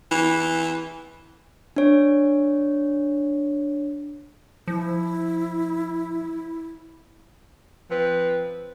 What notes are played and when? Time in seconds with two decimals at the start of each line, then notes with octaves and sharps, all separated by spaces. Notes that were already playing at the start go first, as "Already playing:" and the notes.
0.11 E3
1.76 D4 C#5
4.68 F3 E4
7.90 F3 C4 B4